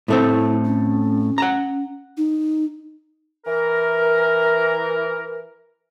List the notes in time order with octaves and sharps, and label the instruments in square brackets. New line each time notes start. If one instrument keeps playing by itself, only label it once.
[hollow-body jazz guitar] A2 A3 C4 [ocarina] E4
[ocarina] C#4
[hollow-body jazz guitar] F#5 A5 A#5
[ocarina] D#4
[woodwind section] E3 A#4